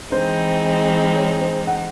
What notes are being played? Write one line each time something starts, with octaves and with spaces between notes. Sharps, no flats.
E3 G#3 C4 D#4 C5
C#5
C5
F#5